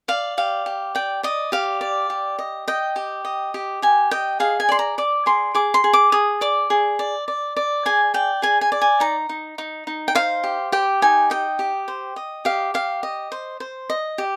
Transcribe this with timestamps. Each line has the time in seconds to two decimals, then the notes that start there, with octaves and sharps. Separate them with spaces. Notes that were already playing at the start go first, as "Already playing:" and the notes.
0.08 D5 F5
0.38 G4 F5
0.66 G4
0.95 D5 G5
1.23 D5 D#5
1.52 G4 F5
1.81 D5
2.10 G4
2.39 D#5
2.68 D#5 G5
2.96 G4
3.25 D#5
3.54 G4
3.82 G4 G#5
4.11 D#5 G5
4.40 G#4 F5
4.60 G#5
4.69 D5 C6
4.79 A#5
4.98 D5 D6
5.26 G#4 C6
5.55 G#4 D6
5.74 C6
5.84 G#4
5.93 D6
6.12 G#4 D#6
6.41 D5 D6
6.70 G#4
6.99 D5
7.28 D5
7.57 D5
7.85 G#4 G#5
8.14 D5 G5
8.42 G#4 G#5
8.61 G#5
8.72 D5
8.82 G#5
9.00 D#4 A#5
9.29 D#4
9.58 D#4
9.87 D#4
10.08 G5
10.15 C5 F5
10.44 G4
10.72 G4 G5
11.02 D#4 G#5
11.30 D#5 G5
11.59 G4
11.88 C5
12.16 D#5
12.45 G4 F5
12.74 G4 F5
13.03 D#5
13.32 C5
13.60 C5
13.90 D#5
14.18 G4